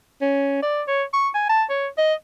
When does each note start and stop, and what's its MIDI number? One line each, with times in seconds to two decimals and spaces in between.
0.21 0.61 61
0.62 0.82 74
0.88 1.03 73
1.13 1.29 85
1.35 1.45 80
1.49 1.64 81
1.70 1.87 73
1.98 2.14 75